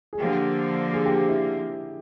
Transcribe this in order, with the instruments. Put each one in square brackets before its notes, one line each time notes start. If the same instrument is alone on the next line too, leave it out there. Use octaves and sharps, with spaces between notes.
[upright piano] G#4
[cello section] D3 F3 A#3 [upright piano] G4
[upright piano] G#4
G4
E4